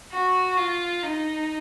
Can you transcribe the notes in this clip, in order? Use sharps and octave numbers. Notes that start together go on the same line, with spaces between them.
F#4
F4
D#4